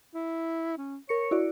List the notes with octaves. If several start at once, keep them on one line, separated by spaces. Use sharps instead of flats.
E4
C#4
A#4 C#5 C#7
E4 F#4 D5